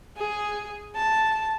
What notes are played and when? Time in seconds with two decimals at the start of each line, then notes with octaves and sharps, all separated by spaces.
0.18 G#4
0.96 A5